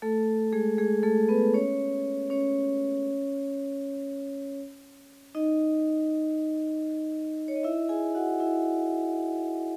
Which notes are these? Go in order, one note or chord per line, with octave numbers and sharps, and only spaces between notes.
A3 A4
G#3 G#4
G#3 G#4
A3 A4
B3 B4
C#4 C#5
C#4 C#5
D#4 D#5
C#5
D#5
E4 E5
G#4 G#5
F#4 F#5
E4 E5